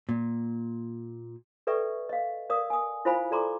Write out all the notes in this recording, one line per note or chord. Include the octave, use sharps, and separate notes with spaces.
A#2
A4 B4 D5 E5 G5 C#6
D#5 F5
A#4 D5 F5 D#6
G#5 D#6
E4 F4 C5 F5 G#5 B5
F4 A4 D5 A#5 C6 D6